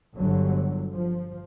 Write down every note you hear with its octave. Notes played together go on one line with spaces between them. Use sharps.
G1 D3 F#3
F3